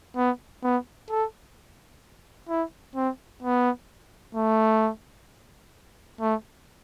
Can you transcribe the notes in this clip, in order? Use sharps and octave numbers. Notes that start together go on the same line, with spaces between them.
B3
B3
A4
E4
C4
B3
A3
A3